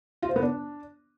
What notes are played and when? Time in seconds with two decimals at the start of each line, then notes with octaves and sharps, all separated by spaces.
0.22 F4
0.29 C5
0.36 B3
0.43 D4